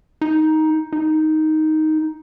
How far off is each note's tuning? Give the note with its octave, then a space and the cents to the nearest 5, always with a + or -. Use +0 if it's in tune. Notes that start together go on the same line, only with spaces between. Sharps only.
D#4 +10
D#4 +5